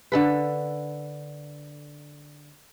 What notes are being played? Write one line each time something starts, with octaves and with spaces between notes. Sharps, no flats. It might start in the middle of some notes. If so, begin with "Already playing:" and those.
D3 A4 B4